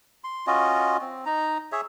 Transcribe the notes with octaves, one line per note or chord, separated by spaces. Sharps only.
C6
C#4 F4 F#4 D#5
C4
D#4 A#5
G#4 C#5 E5